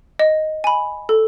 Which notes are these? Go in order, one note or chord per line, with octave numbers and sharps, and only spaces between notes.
D#5
G#5 B5
A4